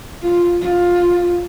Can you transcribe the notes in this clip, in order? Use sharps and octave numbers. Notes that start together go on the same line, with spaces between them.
F4
F4